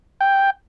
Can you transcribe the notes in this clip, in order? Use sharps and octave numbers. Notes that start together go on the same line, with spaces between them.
G5